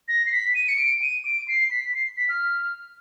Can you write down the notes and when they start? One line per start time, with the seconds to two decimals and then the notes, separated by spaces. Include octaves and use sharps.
0.08 A#6
0.26 C7
0.32 B6
0.55 D#7
0.68 C#7
0.78 D7
1.02 D#7
1.25 D7
1.48 C7
1.71 B6
1.94 C7
2.17 B6
2.29 F6